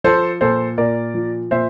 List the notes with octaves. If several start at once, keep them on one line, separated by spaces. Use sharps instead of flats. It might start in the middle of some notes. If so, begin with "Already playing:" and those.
F3 A4 C5
A#2 A4 C5
A#2 A#4 D5
F3
A#2 C5 E5